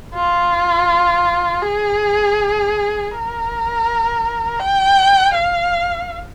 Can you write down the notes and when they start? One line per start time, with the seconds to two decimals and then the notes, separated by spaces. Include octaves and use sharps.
0.14 F4
1.62 G#4
3.12 A#4
4.59 G5
5.34 F5